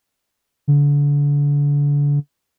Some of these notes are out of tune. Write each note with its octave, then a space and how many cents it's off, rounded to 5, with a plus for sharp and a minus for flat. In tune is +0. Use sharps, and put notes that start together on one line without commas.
D3 -30